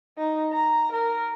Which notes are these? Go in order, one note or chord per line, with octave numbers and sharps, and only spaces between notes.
D#4
A#5
A#4